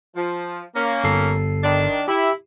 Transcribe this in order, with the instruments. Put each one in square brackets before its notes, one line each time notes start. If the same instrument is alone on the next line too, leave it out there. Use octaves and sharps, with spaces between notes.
[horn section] F3
A#3 C#4
[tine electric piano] G1 A4 C7
[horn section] D#3 D4
[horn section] E4 [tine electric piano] G4